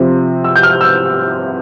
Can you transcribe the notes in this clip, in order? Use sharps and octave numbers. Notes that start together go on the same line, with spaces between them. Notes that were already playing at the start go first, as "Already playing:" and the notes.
Already playing: C3 F3 C4
E6
G6
F6
E6